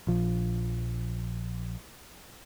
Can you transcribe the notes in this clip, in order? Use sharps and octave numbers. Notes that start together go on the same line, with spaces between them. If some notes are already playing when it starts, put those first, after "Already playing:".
A#1 F3